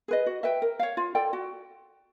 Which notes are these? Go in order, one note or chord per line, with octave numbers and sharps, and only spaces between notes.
G#4 B4 D#5
F#4
B4 E5 G5
A#4
C#5 F5
F4
A4 D5 G5
F#4